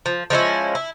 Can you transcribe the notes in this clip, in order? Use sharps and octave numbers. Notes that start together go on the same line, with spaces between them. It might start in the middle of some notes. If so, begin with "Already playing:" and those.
F3
F3 G#3 C#4 E4
E4